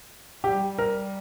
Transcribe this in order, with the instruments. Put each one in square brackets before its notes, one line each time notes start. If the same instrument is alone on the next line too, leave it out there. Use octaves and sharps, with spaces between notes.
[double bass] G3 [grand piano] G4
[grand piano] A#4